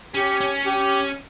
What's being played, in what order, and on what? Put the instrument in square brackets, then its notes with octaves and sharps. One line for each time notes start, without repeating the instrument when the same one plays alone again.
[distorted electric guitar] C#4 [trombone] G4
[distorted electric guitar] C#4
[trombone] G4